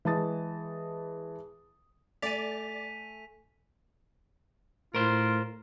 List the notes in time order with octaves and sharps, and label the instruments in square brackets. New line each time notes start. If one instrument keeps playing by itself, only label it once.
[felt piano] E3 G#3 A5 D#6 A6
[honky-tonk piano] A3 [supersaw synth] D5 A6 [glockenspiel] G#5 F7 [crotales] B6 D#7
[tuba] A2 [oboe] F4 [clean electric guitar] A#4 C5